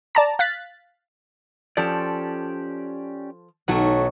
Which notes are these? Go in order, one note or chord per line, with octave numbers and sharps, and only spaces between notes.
D5 A5 A#5
F5 F#6 A6 B6
F3 C#4 G4 A4 D5
B1 F#3 A3 F#4